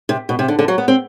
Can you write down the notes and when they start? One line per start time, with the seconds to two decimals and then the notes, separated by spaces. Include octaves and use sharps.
0.09 C3
0.29 B2
0.39 C3
0.48 D3
0.59 D3
0.68 F#3
0.78 B3
0.88 C4